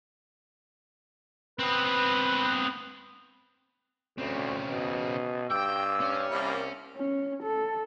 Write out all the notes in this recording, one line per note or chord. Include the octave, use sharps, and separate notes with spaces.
B3 C4 B4
D2 C#3 C4
B2
G2 G5 D6 E6
C#4
C2 G3 A#3 E4
C#4
A4